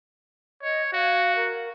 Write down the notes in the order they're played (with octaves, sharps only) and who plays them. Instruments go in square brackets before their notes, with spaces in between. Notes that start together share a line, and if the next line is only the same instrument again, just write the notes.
[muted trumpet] C#5 [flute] D#5
[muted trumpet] F#4 [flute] F5
[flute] A#4